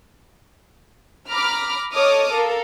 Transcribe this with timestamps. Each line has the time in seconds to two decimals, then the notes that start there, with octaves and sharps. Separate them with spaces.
1.28 A#5 B5 D6 F6
1.92 A4 C#5 D#5 D6 D#6 F6
2.31 A4 A#4 F5